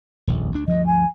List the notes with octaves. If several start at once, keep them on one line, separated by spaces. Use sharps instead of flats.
D#1 A#1 F2
D2 D4
D2 G2 F3 D#5
G#5